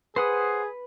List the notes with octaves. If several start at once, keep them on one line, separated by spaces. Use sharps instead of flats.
G#4 B4 C5 F#5 D#6